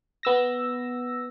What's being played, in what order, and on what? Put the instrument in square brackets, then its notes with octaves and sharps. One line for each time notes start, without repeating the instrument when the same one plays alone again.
[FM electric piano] B3 E6 A#6